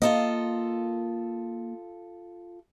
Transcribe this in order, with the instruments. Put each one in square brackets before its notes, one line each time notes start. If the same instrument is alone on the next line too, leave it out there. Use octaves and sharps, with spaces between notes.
[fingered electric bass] A#3 [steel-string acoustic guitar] F4 A4 D#5